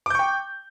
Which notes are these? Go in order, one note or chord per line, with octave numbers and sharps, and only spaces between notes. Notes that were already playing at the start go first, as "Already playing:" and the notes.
G5 C#6 D6 G6